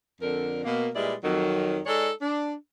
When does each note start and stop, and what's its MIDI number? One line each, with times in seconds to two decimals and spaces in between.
0.21 0.63 41
0.21 0.63 50
0.21 0.63 70
0.65 0.89 47
0.65 0.89 58
0.95 1.14 46
0.95 1.14 55
0.95 1.14 56
0.95 1.14 64
0.95 1.14 71
0.95 1.14 74
1.23 1.79 41
1.23 1.79 51
1.23 1.79 54
1.86 2.09 56
1.86 2.09 63
1.86 2.09 69
1.86 2.09 73
1.86 2.09 74
2.21 2.54 62